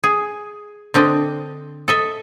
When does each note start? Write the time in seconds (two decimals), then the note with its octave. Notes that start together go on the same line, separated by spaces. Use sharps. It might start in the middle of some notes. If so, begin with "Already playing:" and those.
0.04 G#4
0.94 D3 C4 D4 D#5
1.88 A4 D#5 E5